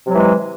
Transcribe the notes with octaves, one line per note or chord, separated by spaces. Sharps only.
C3 E3 F#3 G#3